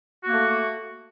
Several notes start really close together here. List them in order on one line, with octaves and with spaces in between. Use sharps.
F#4 A#3 A3